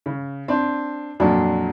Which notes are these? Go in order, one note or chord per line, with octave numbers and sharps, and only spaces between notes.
C#3
C4 D4
F2 A#2 F#3 D4 F4